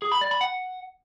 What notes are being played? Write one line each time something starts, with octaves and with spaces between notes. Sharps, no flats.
G#4
B5
D5
B5
F#5